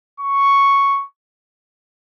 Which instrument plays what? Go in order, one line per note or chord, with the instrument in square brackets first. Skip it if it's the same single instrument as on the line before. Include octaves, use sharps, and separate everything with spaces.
[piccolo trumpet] C#6